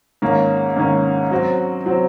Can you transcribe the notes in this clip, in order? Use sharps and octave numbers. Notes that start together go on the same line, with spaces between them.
G#2 D#3 A#3 C#4
G#2 D#3 A#3 C#4
F#3 C4 F#4
F#3 C4 F#4